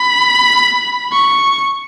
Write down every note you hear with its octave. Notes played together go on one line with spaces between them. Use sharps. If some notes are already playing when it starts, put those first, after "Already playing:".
Already playing: B5
C#6